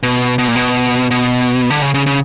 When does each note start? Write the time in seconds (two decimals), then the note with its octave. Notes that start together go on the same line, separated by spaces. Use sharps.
0.03 B2
0.38 B2
0.48 A#2
0.55 B2
1.11 B2
1.70 D3
1.82 C#3
1.94 C#3
2.06 C#3